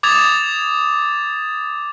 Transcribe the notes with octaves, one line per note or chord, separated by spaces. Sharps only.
D6 D#6 G#6 A6 F7